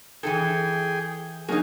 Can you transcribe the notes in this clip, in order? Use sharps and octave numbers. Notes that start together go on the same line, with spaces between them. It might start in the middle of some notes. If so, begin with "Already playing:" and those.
E3 E4 G#4 A4 G5
F#3 A#3 D#4 G#4